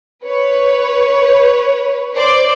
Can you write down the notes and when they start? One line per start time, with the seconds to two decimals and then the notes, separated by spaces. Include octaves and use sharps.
0.25 B4 C#5
2.15 C5 D5